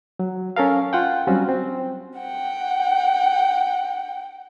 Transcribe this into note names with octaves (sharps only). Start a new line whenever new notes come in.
F#3
C#4 A4 A#4 F5
F4 F#5 G5
F#3 G3 C4 C#4 F4 F#4
C4
F#5 G5